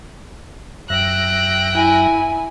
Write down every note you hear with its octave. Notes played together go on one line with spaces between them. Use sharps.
F#2 E5 G5 F#6 A#6
E4 G#5